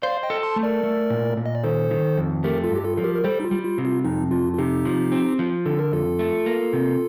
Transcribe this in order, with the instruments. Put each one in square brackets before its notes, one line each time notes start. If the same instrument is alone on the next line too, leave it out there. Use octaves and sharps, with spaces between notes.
[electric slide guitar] C5 [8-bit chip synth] D5 F5
[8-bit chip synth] D#5 G5
[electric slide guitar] A4
[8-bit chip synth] A5 C6
[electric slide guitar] A3
[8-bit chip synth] A#4 D5
[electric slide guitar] A3
A#2
A#2
[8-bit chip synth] D#5
D5
[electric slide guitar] D#3 [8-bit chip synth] A4 C5
[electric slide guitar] D#3
F2
[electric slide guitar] A3 [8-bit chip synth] G4 A#4
[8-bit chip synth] F4 A4
[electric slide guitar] G2 [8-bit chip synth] G4
[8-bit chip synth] F4 A4
[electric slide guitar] F3 [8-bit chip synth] A4
[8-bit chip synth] G4 A#4
A#4
[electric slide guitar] G3 [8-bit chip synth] A4 C5
[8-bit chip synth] D#4
F4
[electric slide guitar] G3
[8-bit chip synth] F4
[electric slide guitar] C3
[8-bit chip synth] F4
[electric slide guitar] F2 [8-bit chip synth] D#4
[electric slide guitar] F2 [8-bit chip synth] F4
[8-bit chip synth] F4
[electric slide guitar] C3 [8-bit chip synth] D#4 G4
[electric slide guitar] F3
C4
F3
[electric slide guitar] D3 [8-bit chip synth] A4
[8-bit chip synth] A#4
[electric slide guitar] F2 [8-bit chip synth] F4 A4
[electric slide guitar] A3
A#3
C3